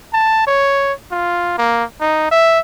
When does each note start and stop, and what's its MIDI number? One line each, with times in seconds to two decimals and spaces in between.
0.14 0.47 81
0.47 0.93 73
1.11 1.55 65
1.58 1.84 58
2.01 2.29 63
2.32 2.60 76